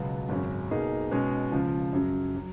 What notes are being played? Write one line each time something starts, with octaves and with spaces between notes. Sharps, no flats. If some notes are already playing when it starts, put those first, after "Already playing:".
Already playing: C#2 B2 F#3 B3
G#1 F#2 C#3 F#3 C#4
B1 B2 A#3 D#4 G#4
B2 G#3 C#4 G#4
C#2 C#3 F3
F#2 C#3 F#3
F#3